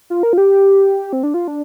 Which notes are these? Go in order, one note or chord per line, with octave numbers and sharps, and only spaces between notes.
F4
A#4
F4
G4
C4
D4
F4
D4